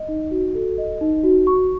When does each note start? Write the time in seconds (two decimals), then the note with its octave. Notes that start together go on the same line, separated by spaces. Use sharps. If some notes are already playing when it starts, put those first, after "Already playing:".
Already playing: D#5
0.08 D#4
0.31 F#4
0.55 A4
0.78 D#5
1.01 D#4
1.23 F#4
1.47 C#6